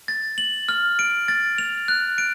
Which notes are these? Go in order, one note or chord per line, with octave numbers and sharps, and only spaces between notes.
A6
F#7
F6
D7
A6
F7
F#6
D7